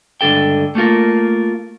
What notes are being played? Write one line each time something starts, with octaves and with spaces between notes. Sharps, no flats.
C#2 G2 D3 A4 G5
A3 A#3 F4 A#4